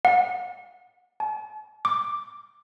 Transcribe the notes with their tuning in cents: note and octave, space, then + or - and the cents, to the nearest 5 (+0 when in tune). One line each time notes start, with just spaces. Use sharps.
F#5 -40
A5 -45
D6 +5